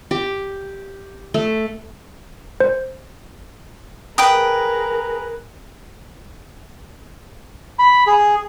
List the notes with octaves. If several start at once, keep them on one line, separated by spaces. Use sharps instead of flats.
G4
A3
C5
G#4 A#4 B4 G5 D#6
B5
G#4